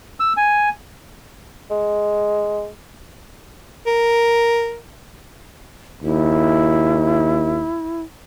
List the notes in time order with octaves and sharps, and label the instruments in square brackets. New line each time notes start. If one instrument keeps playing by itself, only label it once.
[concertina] E6
G#5
[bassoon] G#3
[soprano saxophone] A#4
[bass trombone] D#2 [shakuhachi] E4